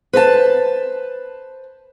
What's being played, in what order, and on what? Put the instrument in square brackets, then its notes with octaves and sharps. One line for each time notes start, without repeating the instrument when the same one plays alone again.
[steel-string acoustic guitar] B4 C5 D#5 A5